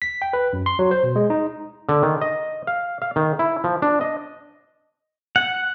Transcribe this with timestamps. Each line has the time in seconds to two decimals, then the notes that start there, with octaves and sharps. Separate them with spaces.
0.02 B6
0.22 G5
0.33 B4
0.53 F#2
0.66 C6
0.79 F#3
0.91 C5
1.03 B2
1.16 G#3
1.30 D#4
1.89 D3
2.03 D#3
2.22 D#5
2.67 F5
3.02 F5
3.16 D#3
3.39 E4
3.64 F3
3.82 D4
4.01 D#5
5.36 F#5